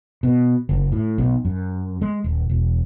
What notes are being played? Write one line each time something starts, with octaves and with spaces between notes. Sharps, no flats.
B2
F#1
A2
B1
F#2
G#3
D#1
E1